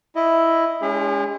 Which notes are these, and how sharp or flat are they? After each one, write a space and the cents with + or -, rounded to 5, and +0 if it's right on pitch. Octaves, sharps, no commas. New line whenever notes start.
E4 +0 D#5 +0
G#3 +10 C#4 +40 G#4 -45